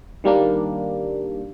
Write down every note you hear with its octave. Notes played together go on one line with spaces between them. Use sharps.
D#3 G3 A#3 D4